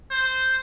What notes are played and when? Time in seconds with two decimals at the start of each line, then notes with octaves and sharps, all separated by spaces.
0.11 C5